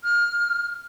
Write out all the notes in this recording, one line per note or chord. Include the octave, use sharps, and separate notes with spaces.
F6